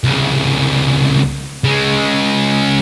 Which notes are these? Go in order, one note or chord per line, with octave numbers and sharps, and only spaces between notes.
C2 C#3
C#3 G#3